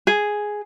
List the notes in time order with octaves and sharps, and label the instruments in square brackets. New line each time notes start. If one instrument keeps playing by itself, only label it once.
[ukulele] G#4